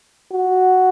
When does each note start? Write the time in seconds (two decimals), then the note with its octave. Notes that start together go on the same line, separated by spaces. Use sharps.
0.32 F#4